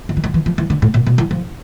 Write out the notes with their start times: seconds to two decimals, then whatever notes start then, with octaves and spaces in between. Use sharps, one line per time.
0.09 D#3
0.17 E3
0.24 D#3
0.34 E3
0.46 F3
0.58 E3
0.70 D3
0.82 A2
0.94 A#2
1.07 B2
1.18 E3
1.31 F3